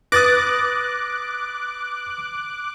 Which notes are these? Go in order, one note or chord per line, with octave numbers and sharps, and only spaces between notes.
B4 D6 D#6 F#6 A6 A#6